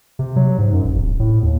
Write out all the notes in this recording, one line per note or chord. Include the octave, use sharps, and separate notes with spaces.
C3
F#3
G#2
F#2
A1
D1
A2
D#2